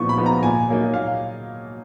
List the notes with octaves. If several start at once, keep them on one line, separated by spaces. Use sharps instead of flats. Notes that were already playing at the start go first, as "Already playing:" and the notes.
Already playing: A#2 F3 B3 D#4 C#6
B5
F3 B3 D#4
A#5
A#2 G#5
F#3 A#3 D#4
A#2 F5